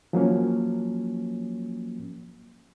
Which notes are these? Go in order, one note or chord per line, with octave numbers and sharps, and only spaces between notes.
F3 F#3 A#3 C#4